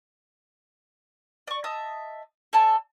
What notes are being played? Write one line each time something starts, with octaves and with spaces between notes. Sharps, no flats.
D5 C#6
D#5 E5 A5 D#6
A4 D5 G#5 A5